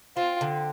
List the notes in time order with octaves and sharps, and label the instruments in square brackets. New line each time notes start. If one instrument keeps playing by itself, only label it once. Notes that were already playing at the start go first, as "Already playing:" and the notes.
[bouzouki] C4 [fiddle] F4
[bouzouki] D3